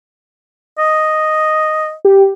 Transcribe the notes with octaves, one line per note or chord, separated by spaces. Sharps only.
D#5
G4